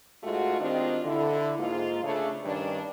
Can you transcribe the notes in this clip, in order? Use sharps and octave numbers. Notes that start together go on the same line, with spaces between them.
G#2 G#3 A3 F4 F#4
D#3 C4 D4 F4 G4 D#5
D3 E4
G#2 A#3 F4
C#3 A3 D4
G2 D#3 C#4 D4